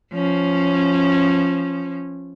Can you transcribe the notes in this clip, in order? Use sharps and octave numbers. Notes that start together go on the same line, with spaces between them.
F3 C#4